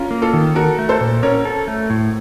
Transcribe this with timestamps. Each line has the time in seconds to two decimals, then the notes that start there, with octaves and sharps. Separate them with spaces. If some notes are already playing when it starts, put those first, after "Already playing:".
Already playing: C#4 F4 A#4
0.11 A#3
0.22 F4 A4
0.33 D#3
0.55 F#4 A4 A#4
0.79 A3
0.89 A4 C5
1.01 A#2
1.23 C#4 A#4 C#5
1.45 A4
1.68 A3
1.90 A2